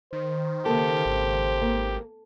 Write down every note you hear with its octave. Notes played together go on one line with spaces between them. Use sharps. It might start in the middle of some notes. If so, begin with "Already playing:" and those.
D#3 C5
C#3 A#3 G4 A4
G#1
A#3